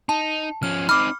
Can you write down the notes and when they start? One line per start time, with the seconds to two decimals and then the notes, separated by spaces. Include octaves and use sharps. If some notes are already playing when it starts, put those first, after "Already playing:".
0.09 D#4 A5
0.63 F3 C#4 F6
0.89 C4 D#4 B5 D6 F6